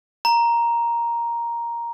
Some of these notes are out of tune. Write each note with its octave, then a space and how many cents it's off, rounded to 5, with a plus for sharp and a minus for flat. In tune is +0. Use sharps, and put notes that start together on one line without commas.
A#5 +5